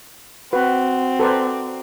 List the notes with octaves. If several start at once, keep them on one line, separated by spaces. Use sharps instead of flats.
C4 F#4 B4
A4 B4 C5 D5 A#5 C#6